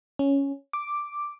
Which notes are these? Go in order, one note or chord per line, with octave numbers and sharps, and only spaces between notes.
C#4
D6